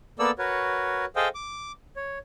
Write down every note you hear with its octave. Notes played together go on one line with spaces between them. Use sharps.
A#3 B3 A4 D5 E6
F#4 A#4 B4 C#5
G#4 A4 C5 D#5 F5 G5
D6
C#5